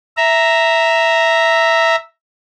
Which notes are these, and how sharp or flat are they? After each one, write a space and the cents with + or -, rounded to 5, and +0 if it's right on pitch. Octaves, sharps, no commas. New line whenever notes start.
E5 +0 A#5 +0